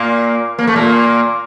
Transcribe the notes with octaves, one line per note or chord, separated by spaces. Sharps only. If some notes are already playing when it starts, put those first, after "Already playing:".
Already playing: A#2 A#3
A#3
A3
A#2 A#3